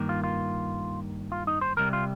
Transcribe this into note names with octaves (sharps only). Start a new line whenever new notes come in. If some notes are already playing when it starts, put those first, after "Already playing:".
Already playing: G2 D#3 A#3
F4
F4
F4
D#4
C5
C2 C3 G3 A#4
F4